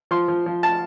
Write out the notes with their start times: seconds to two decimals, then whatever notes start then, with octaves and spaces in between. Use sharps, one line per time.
0.11 F3 C6
0.28 F3
0.46 F3
0.63 A5